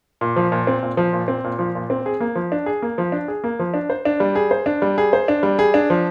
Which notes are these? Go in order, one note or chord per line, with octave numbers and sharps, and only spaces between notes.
A#2
F3
A#2
C4
A#2
F3
A#2
C4
A#2
F3
A#2
C4
G#4
A#3
F3
D4
G#4
A#3
F3
D4
G#4
A#3
F3
D4
C5
D4
G3
G#4
C5
D4
G3
G#4
C5
D4
G3
G#4
D4
F3